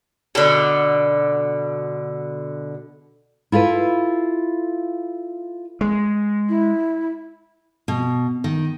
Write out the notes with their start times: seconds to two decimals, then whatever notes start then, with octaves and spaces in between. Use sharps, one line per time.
0.35 B2 D3
3.52 E4 F4 A4 B4
5.81 G#3
6.49 E4
7.88 B2
8.44 D#3